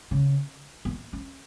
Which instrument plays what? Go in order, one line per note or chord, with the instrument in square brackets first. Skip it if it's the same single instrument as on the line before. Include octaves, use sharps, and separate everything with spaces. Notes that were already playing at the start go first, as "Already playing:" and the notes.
[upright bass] C#3
B3
C#4